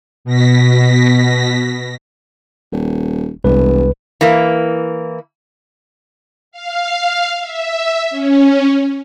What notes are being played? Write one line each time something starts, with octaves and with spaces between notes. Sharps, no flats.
B2 A#6 B6
D#1
E1 C2 B4
E3 A#3
F5
E5
C#4